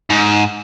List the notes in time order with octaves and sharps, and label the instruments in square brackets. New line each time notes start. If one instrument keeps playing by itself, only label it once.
[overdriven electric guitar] G#2